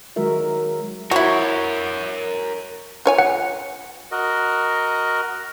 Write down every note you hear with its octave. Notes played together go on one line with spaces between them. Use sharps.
D#3 F#3 G#3 F#4 A#4 E5
E4 F#4 A#4 C#5
F4 C#5 G#5
F#5
F#4 A#4 D#5